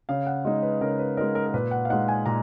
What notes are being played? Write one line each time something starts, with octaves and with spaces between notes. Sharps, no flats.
C#3 F5
F#5
G#3 D#4 D#5
B4
C#3 A#4
B4
G#3 D#4 A#4
A#4
A#4
A#2 B4
F#5
F5
G#3 D#4 F#5
G#5
A#2 A#5